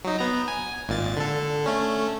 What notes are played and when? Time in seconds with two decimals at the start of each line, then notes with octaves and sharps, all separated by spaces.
0.05 F#3 D#4
0.19 B3 A#5
0.48 G#5
0.88 G#1 A#2 A6
1.17 D3 A4
1.66 A3 C#4